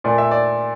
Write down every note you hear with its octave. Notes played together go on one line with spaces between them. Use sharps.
A#2 A3 D5
E5
D5